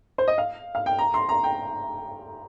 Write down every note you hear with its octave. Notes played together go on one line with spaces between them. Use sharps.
C5
D#5
F5
F5
G5
A#5
C6
A#5
G5